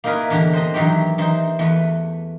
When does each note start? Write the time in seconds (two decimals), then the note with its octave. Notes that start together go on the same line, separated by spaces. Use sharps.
0.04 A#3 D#4 E4 G#4 A#4 B4
0.30 E2 D3 D4 G4 A#5
0.53 C5 D#5
0.74 D#3 E3 F#3 D#4 G4
1.18 E3 D#4 C5
1.59 E2 A3 B4